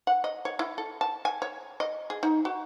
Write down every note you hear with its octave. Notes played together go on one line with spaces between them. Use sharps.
F#5
D#5
C#5
E4
A4
A5
G#5
C#5
D#5
G#4
D#4
F#4